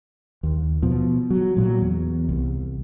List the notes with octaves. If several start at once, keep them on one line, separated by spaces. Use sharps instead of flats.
D#2
B2 F3
F#3
A#2 F3 F#3
E2
C2